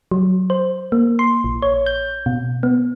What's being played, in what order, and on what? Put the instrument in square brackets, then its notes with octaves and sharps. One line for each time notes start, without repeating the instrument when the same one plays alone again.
[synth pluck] F#3
C5
A#3
C6
A#1
C#5
G6
B2
B3